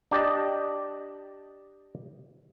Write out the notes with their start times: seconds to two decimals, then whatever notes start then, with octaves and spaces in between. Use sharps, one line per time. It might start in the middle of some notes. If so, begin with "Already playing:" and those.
0.11 D4 G4 D5 D#5